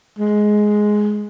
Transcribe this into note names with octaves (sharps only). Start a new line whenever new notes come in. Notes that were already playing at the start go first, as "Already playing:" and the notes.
G#3